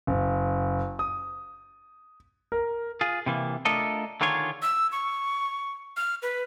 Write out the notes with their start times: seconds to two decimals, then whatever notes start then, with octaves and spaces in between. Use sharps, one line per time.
0.07 F#1
0.99 D#6
2.52 A#4
3.01 F4 G#4
3.26 C3 E3 A#3
3.65 A3 D4 F4 A4 A#4 D#5
4.21 D3 D#3 D4 F4 G#4 C#5
4.62 E6
4.92 C#6
5.97 F6
6.22 B4